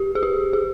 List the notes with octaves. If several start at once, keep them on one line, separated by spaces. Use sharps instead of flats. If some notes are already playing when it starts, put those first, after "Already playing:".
Already playing: G4
G#4
G4
G#4